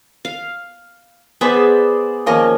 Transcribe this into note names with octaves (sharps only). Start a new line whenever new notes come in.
F5
B3 G#4 B4 C5 D5 E5
D#3 F3 A#3 C#4 D#5